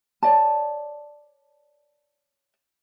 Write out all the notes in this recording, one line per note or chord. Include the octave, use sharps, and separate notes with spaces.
C#5 D5 A5